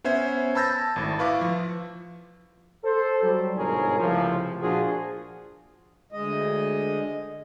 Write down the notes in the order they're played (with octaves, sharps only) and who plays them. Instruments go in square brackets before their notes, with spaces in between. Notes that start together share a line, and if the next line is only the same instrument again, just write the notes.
[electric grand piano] B3 C#4 C5 E5 G#6
A5 B5 E6 G6 A6 A#6
G#1 A2
E4 B4 F5 C#6 D6
F3
[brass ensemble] A4 C5
F#3 G3
G1 G#2 B2 G#4 A#4 C#5
C#2 A2 C3 F3
A#2 F3 D4 F4 F#4 G#4
[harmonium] D2 G#3 D#5